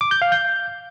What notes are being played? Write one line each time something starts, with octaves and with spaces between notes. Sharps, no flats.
D6
G6
F5
G6